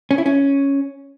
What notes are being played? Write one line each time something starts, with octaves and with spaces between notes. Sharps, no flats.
C#4
E4
C#4